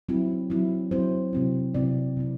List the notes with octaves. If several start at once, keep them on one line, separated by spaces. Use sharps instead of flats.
F#3 C4 E4
F#3 C4 E4
F#3 C4 E4 C5
C3 F#3 C4 E4
C3 F#3 C4 E4 D5
C3 F#3 C4 E4